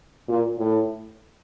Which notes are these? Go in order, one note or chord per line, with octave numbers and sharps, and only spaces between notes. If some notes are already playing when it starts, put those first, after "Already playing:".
A#2
A2